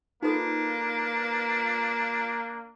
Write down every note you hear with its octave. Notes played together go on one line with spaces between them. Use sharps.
A#3 D4 D#4 F4 A4 B4